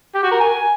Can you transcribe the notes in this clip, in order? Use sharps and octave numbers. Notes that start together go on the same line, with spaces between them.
G4
F#4
A#4
G#5